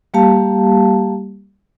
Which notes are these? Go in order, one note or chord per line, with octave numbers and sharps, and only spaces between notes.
G3 A#3 G4 F5 A5